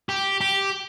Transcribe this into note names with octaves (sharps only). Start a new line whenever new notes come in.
G4
G4